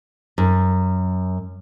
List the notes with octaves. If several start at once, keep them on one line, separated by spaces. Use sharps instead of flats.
F#2